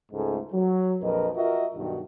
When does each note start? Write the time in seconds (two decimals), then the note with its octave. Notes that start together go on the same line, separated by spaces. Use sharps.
0.12 C#2 G#2 G#3 A3
0.53 F#3
1.01 A#1 F2 A#4 B4 D#5
1.35 F4 F#4 A#4 D#5 E5
1.75 B1 G2 D#3 F#4